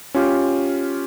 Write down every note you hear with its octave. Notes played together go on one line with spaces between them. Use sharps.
C#4 F4 G4